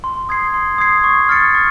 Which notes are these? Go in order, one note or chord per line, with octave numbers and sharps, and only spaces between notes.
C6
D#6 G#6 C7
C6
D#6 G#6 C7
C#6
F6 A6 C#7
C#6